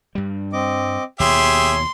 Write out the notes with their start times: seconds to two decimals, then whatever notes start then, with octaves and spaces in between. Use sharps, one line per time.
0.15 G2 G3
0.53 C4 D#5 D6
1.20 D#2 B2 G4 G#4 C#5 E5 C6